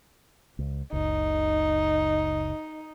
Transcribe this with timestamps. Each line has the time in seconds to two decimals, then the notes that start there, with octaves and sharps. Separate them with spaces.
0.59 C#2
0.92 F#1 C#2 D#4